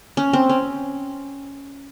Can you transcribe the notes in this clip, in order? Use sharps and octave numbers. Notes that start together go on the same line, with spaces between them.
C#4
C4
C#4